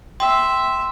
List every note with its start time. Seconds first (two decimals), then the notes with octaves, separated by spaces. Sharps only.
0.20 E5 G5 C6